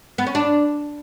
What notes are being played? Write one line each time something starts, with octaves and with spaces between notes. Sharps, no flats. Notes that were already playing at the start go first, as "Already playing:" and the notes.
B3
C#4
D4